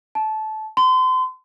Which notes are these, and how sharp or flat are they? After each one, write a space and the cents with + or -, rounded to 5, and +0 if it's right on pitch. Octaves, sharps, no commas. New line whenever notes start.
A5 -20
C6 -35